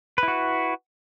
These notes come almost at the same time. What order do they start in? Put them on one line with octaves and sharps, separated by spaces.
B4 E4 F#4